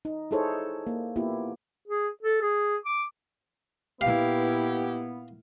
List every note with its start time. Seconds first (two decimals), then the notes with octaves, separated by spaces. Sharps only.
0.05 D#4
0.31 D#4 E4 G#4 A4 C5 C#5
0.87 A#3
1.16 A#3 B3 E4 F4 G4
1.87 G#4
2.23 A4
2.42 G#4
2.85 D6
4.01 A#2 B3 E4 G4 F5